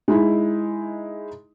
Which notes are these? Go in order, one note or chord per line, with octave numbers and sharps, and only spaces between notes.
G#3 D#4 E4